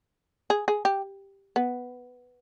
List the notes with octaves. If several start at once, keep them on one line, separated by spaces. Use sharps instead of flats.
G#4
G#4
G4
B3